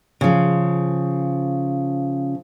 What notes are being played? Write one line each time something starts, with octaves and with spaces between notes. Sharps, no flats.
C#3 F3